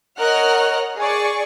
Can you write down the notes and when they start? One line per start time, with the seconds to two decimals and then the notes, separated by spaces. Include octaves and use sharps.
0.19 A#4 C#5 D#5 F#5 F6 F#6
0.98 G#4 D5 C#6